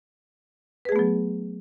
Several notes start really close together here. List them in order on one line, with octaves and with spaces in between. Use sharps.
B4 G#4 A3 B3 F#3